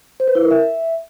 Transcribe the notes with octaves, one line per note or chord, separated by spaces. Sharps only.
C5
B4
E4
A#4
E5